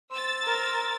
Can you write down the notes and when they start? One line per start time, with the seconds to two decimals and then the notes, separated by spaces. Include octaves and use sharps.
0.11 C5 E6 A6
0.44 A#4